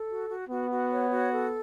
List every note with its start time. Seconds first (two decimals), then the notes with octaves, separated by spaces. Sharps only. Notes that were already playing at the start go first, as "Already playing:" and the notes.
Already playing: A4
0.09 F#4
0.28 F#4
0.49 B3 F#4
0.70 F#4
0.91 C#5
1.11 F#4
1.31 A4